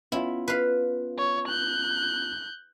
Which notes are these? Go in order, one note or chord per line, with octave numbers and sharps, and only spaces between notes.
B3 C#4 E4 F4
B4 F5
C#5
F#6 G6